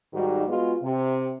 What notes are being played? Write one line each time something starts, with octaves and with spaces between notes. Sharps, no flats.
G#2 D#3 G3 F#4
G#3 B3 F4 F#4 G#4
C3